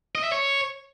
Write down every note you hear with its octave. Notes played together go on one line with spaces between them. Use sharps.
D#5
E5
C#5